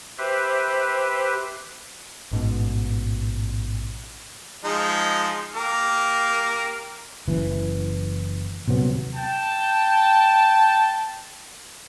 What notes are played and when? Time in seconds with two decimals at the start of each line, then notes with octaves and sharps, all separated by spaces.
0.18 G4 B4 C5 E5
2.31 A1 G#2 B2
4.64 F3 G#3 D#4
5.55 A#3 G4 A#4
7.28 F#1 E3
8.68 D#1 C3 F#3 B3
9.15 G5 A5